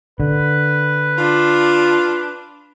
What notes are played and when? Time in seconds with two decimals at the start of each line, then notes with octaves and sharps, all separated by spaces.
0.20 D3 B4
1.18 D4 F4